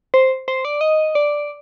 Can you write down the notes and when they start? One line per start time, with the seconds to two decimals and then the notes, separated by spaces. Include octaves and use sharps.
0.14 C5
0.48 C5
0.65 D5
0.81 D#5
1.15 D5